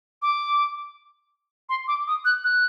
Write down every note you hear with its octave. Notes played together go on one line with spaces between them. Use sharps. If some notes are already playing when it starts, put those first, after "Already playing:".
D6
C6
D6
D#6
F#6
F#6